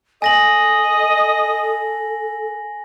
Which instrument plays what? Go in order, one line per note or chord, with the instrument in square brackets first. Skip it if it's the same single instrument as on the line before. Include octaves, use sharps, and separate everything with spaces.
[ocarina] A4 [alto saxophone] D#5 [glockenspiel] G#5 A#6 F#7